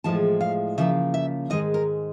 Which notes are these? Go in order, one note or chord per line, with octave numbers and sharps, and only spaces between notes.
A2 F3 G#3 A5
F5
C#3 F3 A#3 E5
E5
G#2 D#3 G#3 D#5
A#4